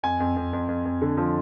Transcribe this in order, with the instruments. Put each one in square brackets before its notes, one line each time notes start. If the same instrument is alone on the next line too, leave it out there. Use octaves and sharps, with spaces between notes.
[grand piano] F2 G#5
F2
F2
F2
F2
F2
D3
F3